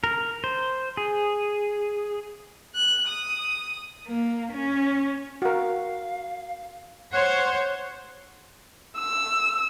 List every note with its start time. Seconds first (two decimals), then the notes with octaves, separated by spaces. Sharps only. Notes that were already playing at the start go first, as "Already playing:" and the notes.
0.04 A#4
0.44 C5
0.97 G#4
2.76 F#6
3.08 D#6
4.08 A#3
4.52 C#4
5.42 F#4 A#4 F5
7.13 C5 C#5 F#5 C6
8.99 E6